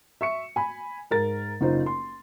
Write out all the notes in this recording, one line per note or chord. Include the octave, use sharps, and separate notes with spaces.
E5 C#6 C#7
G#5 B5
G#2 A#4 A6
F#1 D#4 F4 C5
C6